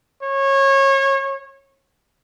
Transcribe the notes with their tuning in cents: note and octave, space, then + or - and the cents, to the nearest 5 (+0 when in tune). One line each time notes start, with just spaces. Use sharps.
C#5 -25